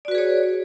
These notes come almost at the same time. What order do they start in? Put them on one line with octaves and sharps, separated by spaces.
D5 F#4 B4 G#4 C#5